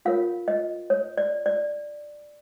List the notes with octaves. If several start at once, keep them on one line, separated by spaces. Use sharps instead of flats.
F4 A#4 C#5 F5
D#5
C#5
D5
D5